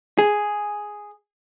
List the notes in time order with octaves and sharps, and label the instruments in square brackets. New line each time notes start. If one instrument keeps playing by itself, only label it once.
[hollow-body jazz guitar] G#4